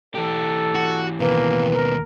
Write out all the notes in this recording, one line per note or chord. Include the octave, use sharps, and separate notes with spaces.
E3 G4 A4
F#4
D#2 B2 A#3 B4
A#4